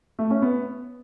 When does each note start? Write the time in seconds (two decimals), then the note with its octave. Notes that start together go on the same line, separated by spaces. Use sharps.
0.19 A3
0.30 C#4
0.42 B3